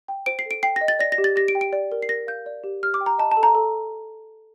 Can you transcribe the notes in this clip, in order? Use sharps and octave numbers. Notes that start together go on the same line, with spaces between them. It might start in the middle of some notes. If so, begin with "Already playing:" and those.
G5
C5 D7
C7
A4 D7
G5 C7
D#5 A#6
A6
D5 A#6
A#6
G4
A6
G4 A#6
D7
G5
D7
D5
A#4
C7
A#4 A#6
F5 G6
D5
G4
G4 F6
D6
G5
A#5
D#5 A5
A5
A4
A#5
A4